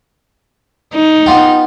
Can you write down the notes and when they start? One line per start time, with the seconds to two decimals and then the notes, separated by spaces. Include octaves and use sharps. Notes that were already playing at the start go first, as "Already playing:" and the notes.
0.93 D#4
1.26 B3 F4 G4